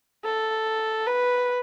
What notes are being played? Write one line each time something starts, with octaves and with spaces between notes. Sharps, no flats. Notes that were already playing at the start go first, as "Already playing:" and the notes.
A4
B4